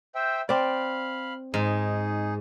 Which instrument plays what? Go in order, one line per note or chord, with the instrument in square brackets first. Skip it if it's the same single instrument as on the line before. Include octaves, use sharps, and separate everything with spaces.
[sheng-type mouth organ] C5 E5 G5
[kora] C4 D5 [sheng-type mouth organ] F5 B5
[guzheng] G#2 [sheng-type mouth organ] D#4 G#4